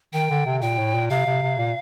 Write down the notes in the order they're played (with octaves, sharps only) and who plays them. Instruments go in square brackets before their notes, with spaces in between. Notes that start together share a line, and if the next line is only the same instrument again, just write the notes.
[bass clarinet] D#3 [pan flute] G5
[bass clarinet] D3
C3
[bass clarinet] A#2 [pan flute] G5
[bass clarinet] A2
A#2
[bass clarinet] C3 [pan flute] F5
[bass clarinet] C3
C3
A#2